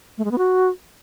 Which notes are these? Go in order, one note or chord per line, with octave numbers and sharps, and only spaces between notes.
A3
G#3
B3
F#4